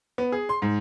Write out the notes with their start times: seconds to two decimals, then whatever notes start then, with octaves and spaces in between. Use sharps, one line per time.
0.18 B3
0.32 G#4
0.49 C6
0.62 G#2